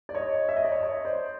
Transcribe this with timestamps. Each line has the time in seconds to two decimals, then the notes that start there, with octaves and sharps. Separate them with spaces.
0.09 D5
0.15 C#5 D#5
0.49 E5
0.57 D#5
0.65 D5
0.72 C#5 D#5
0.83 C#5 D#5
1.05 C5 D5